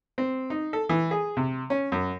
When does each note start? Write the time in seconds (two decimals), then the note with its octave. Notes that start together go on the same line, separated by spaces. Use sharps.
0.18 C4
0.50 D#4
0.73 A4
0.89 E3
1.11 G#4
1.37 C3
1.70 C#4
1.92 F#2